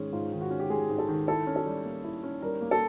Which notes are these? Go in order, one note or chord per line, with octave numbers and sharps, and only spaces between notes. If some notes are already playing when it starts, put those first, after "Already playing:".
Already playing: G#2 D#3 G#3 C#4
G#2 F4
D#3
F#4
C#4
G4
G#3 G#4
G#2
A4
D#3
E4 A4
C#4
A4
G3
A#3
E4
C#4
G3 A#4
A#3
A4